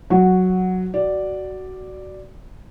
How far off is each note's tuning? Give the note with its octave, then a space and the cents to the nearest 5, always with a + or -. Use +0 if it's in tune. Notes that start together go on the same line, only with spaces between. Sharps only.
F#3 +0 F#4 -5
F#4 +15 D5 +0